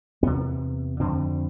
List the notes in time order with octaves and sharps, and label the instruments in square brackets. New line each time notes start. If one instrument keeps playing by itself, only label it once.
[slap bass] E2 C3 B3
F2 D3 C4